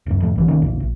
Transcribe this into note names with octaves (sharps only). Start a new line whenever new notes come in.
D#1 F#2
F2 A2
A#1 E3
C2 D#3 A#3 C#4
A#1 E2 A#2 A#3
A#1